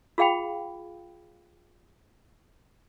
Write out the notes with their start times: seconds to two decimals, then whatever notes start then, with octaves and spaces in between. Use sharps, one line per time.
0.18 F4 G#4 F5 G5 B5